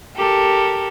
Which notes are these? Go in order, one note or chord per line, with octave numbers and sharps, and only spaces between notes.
G4 A4 A#4